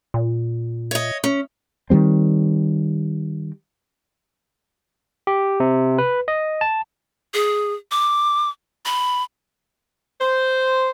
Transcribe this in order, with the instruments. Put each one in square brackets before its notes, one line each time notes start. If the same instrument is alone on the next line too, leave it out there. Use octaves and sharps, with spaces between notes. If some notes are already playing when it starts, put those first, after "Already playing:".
[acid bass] A#2
[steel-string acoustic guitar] C#5 D#5
C#4
[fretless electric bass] D#3 F3 G3 C4
[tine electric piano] G4
C3
B4
D#5
A5
[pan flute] G#4
D6
B5
[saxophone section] C5